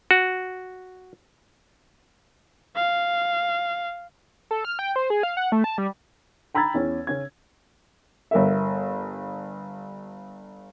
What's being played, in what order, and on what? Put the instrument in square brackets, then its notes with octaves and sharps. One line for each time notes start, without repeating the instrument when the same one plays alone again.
[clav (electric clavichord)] F#4
[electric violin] F5
[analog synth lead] A4
F6
G5
C5
G#4
F5
F#5
A3
A5
G3
[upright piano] G5 A#5 B5 E6 G#6 A6
E2 C#4
C#3 C#4 G#6
G1 A#4 E5